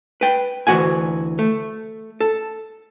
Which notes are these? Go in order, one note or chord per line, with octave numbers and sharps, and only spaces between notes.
B4 G5
D2 E3 C4 F#4 F#5 G#5
A3
A4